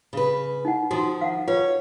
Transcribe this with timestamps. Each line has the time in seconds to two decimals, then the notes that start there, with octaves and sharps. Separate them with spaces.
0.13 C#3 B4
0.65 D#4 E4 F#5
0.91 D#3 F3 F#4
1.21 F5 F#5
1.48 F4 B4 C#5